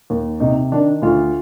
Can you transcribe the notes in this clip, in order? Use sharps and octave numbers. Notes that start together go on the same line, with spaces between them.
D#2
C3 D#4
D#3 D4
D2 F4